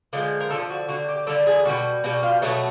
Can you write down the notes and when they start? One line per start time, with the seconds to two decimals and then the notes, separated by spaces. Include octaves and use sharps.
0.13 D3 F3 G#3
0.40 A#4
0.50 D3 F3 G#3 A4
0.70 F#4
0.88 D3 G3 F#4
1.08 G4
1.27 D3 G3 A4
1.47 G#4
1.65 G3 F#4
1.69 B2
2.04 B2 G3
2.23 F4
2.42 B2 F#3 A3 D#4